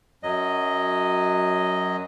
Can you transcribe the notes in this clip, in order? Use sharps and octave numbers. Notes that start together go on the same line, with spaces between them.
F#2 F#3 D#5